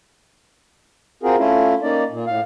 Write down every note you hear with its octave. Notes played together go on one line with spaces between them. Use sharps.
C4 F4 F#4 G#4 A#4
A3 C#4 E4 F4
A#3 C#4 D#4 D5
A#2
A2 F5